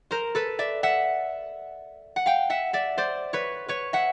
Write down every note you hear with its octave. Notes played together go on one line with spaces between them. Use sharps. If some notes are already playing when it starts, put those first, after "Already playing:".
A#4 C5
A4 B4
D5 E5
E5 F#5
F#5
F5 G5
E5 F#5
D5 E5
C5 D5
B4 C#5
B4 C#5
E5 F#5